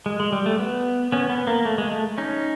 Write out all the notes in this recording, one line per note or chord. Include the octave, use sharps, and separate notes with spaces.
G#3
G#3
G3
A3
B3
B3 C#4
B3
A#3
A3
G#3
A3
C#4 D#4